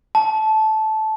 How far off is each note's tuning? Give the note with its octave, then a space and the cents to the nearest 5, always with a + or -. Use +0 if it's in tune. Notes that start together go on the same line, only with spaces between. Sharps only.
A5 -15